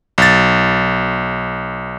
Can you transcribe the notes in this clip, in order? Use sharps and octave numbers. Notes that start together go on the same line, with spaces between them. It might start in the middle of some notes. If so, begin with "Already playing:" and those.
B1 A6